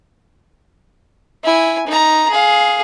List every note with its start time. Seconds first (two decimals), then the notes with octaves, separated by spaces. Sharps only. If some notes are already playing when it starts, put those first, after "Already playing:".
1.44 E4 G#5
1.87 D#4 A#5
2.30 G#4 F5